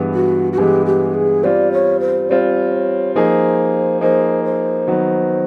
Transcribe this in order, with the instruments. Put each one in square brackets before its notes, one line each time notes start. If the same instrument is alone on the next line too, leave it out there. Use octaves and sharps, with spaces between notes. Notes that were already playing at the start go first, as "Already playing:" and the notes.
Already playing: [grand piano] G2 E3 G#3 B3
[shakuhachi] F#4
F#4
[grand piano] G2 E3 G#3 B3 [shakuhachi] G4
[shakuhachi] G4
G#4
[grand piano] G3 C4 F4 [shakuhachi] D5
[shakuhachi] C#5
C5
[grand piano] G3 C4 F4 [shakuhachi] D5
[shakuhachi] C#5
[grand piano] F3 A#3 D#4 G#4 [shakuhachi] C5
[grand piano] F3 A#3 D#4 G#4 [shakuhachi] C5
[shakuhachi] C5
[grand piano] D#3 F#3 B3